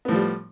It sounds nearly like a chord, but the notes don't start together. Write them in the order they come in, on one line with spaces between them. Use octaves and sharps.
B3 A2 F3 G3